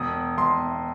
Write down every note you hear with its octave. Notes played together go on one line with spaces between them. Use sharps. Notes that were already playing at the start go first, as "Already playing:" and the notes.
Already playing: E1 D#6
E1 C6